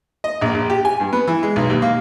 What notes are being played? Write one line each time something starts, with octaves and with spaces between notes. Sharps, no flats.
D#5
A#1
A#1
G4
G#5
G2
B3
E3
G#3
B1
D#2
A#3